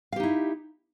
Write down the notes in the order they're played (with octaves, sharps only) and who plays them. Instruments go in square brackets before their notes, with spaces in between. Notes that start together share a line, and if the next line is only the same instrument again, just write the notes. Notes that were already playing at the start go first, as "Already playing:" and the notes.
[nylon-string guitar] F5
G4
D#4
E4